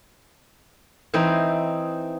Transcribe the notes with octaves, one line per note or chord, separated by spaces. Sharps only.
E3 C4 D#4